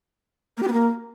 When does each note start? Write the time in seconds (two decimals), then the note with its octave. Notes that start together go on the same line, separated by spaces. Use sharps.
0.57 A#3
0.62 G4
0.67 B3
0.72 A#3